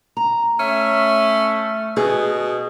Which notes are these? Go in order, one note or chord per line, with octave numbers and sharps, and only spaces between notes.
A#5
A3 C#4 E5
B2 G#4